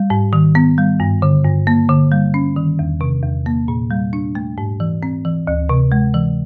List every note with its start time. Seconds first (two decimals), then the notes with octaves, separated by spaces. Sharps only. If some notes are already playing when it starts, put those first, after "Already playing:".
Already playing: G3
0.10 G#2
0.33 D#3
0.55 B3
0.78 G3
1.00 G2
1.22 D3
1.45 G2
1.67 A#3
1.89 D3
2.12 G3
2.34 C#4
2.56 D#3
2.79 E2
3.01 C3
3.23 E2
3.46 A#3
3.68 A#2
3.91 G3
4.13 D4
4.35 A3
4.58 G#2
4.80 E3
5.03 C4
5.25 E3
5.47 D2
5.69 C3
5.92 G#3
6.14 E3